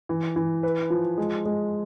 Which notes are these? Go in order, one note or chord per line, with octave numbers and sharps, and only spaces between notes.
E3
E3
B4
F3
G#3
G#3